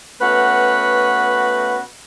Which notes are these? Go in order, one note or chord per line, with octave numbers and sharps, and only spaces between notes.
A3 B3 C#4 F#4 B4